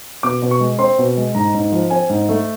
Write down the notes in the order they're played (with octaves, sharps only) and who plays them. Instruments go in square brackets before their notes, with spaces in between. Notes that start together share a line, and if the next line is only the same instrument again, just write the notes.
[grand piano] B2 D6
B2
C#6
G#3
C4 C6
B2
G#3
G#2 A#5
G#2
F3
C4 G#5
G#2
A3